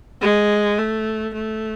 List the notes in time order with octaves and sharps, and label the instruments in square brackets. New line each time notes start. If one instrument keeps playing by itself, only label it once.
[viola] G#3
A3
A3